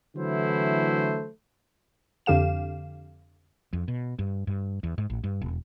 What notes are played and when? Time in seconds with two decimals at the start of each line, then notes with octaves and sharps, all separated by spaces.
0.16 D3 E3 F#3 A3 E4 C5
2.26 F2 D3 G4 F5 E7
3.73 F2
3.88 B2
4.19 G2
4.47 G2
4.83 E2
4.98 G#2
5.10 A1
5.24 G2
5.41 E1